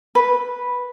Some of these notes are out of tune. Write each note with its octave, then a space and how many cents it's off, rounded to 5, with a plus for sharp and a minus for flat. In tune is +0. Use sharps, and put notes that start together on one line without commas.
B4 -5